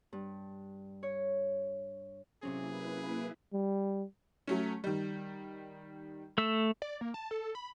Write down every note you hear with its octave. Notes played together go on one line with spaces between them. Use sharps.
G2
C#5
C3 F#3 A#3 C4 C#4 E4 G#4 B4
G3
F#3 A3 C#4
D#3 G3
A3 E6
D5
A#3
A5
A4
B5